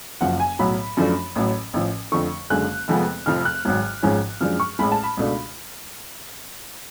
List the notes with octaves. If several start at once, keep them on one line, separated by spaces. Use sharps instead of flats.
F#1 F#2 F3 F#5
G#5
B1 A2 F#3 B5
F#2 F3 A3 D4
A1 A2 F#3
A1 A2 F3
F2 D3 F3 A3 C#6
F#1 F#2 D3 G#3 F#6
F1 F2 F3 G#3 B3
F1 F2 F3 F6
F#6
G#1 G#2 F#3
G#1 G#2 F3 G#3 C#4
F#2 F3 G#3 D4 F6
C#6
A1 A2 G#3 B5
A5
B5
C#2 B2 A3 D4